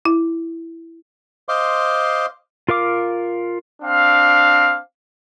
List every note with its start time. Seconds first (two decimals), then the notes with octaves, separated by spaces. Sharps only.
0.05 E4
1.49 C5 D#5 F5 C6 D6
2.69 F4 A#4 F5 D6
3.82 C4 D4 F5